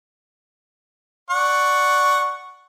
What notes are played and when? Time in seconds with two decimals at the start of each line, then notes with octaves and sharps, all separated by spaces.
1.30 D5 F#5 C#6